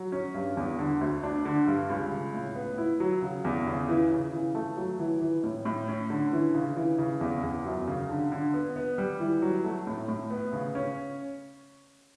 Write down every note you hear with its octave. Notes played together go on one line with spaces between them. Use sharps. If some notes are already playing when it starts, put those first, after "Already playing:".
Already playing: F#3
C#4
G2
E2
D3
D2
D4
D3
G2
C#2
C#3
A2
B3
E4
F#3
C#3
E2
C#3
E3
C#3
E3
A3
F#3
E3
E3
A2
A2
C#4
D3
E3
C#3
E3
C#3
E2
E2
F#2
C#3
D3
D3
B3
B3
G3
E3
F#3
A3
A2
A2
B3
C#3
C#4